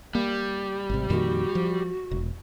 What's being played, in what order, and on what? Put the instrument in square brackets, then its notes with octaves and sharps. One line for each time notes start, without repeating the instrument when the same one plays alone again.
[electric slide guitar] G3 [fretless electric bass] A#3
[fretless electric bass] G#1 C3
[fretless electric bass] F2 A#2 D#3 [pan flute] F#4
[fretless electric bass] F3
E1